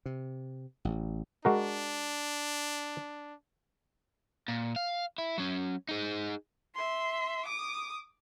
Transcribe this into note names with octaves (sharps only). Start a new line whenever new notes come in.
C3
A1
G#3 D4 F#4 A#4
A#2
F5
E4
F#3 C#4
D#4 G#4
E5 C6
D6 D#6